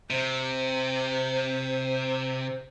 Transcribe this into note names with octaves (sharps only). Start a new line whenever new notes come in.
C3 C5